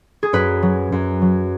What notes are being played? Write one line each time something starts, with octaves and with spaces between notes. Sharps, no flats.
G#4
F#2 B4
F#3
F#2
F#3